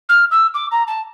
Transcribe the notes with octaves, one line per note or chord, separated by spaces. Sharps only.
F6
E6
D6
A#5
A5